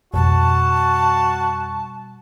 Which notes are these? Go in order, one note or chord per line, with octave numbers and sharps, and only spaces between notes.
F2 B2 G3 F#4 A5